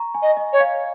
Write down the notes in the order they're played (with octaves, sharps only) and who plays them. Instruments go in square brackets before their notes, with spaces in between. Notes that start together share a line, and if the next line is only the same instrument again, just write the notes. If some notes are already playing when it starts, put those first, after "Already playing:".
Already playing: [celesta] A#5 C#6
G#5
[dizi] D#5
[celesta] D#5
[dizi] C#5
[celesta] F5